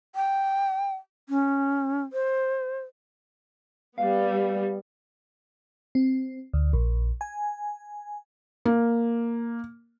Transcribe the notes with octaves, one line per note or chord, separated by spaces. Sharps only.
G5
C#4
C5
G3 B3 F5
C4
D2
A#1
G#5
A#3